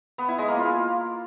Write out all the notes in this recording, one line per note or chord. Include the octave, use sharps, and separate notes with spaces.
B3
E4
G#3
A#3
F4